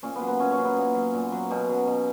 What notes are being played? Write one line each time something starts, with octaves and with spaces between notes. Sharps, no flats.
A#2 C#4
B3
F#3
B3
A#2 C#4
C#4
F#3
B3
A#2
F#3
A#2
F#3
B2 C#4
F#3
B2